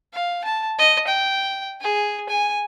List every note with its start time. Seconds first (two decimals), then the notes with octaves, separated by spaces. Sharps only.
0.13 F5
0.44 A5
0.78 D#5
1.08 G5
1.81 G#4
2.29 G#5